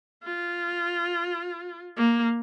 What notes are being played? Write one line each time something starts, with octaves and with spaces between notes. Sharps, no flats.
F4
A#3